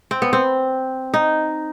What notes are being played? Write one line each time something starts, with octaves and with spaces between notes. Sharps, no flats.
C4
B3
C4
D#4